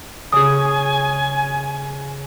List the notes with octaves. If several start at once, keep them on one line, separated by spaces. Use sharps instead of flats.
C#3 G#4 G#5 D#6